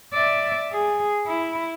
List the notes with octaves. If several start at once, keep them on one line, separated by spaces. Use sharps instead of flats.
D5 E5
G#4
E4